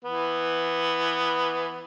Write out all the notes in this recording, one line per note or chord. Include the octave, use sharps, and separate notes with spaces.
E3 B3